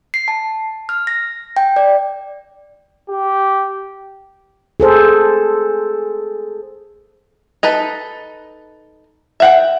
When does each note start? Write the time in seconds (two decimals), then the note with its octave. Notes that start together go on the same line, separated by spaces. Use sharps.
0.14 C7
0.28 A5
0.89 F6
1.07 A#6
1.57 G5
1.76 D5
3.09 G4
4.80 G#4 A4 C5
7.63 D#4 A4 B4
9.40 E5 F#5 G5